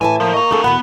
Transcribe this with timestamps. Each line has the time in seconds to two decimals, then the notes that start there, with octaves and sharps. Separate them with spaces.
0.01 A2 E3 E5 G#5 A5
0.20 F3 A#3
0.33 D#5 A#5 C#6
0.51 C#4 D#4 G#4 A4
0.64 E2 B2 B3 F#5 B5